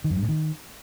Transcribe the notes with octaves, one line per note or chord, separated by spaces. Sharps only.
D#3
F#2
G2
A2
D#3